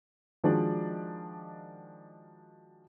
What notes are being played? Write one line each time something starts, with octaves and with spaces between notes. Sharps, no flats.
D#3 F3 G#3 D4 F#4 D5